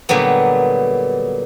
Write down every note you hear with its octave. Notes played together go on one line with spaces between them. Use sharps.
A#2 D3 F#3 G3 B3